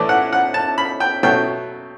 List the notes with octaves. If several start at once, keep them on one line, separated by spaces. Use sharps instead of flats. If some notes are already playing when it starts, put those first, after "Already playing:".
Already playing: A2 E3 A3 D5
F#5
F#5
A5
B5
G5
B2 F#3 A3 G5